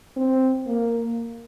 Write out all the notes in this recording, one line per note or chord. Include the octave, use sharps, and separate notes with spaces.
C4
A#3